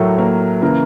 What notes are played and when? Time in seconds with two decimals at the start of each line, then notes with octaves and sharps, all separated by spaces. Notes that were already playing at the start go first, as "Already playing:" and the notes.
Already playing: A2 F#3 A3 A4 A#4
0.18 A#3 A#4
0.62 C#3 E3 A#3 A#4